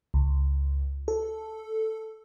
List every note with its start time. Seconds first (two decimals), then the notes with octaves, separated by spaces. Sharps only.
0.14 C#2
1.08 A4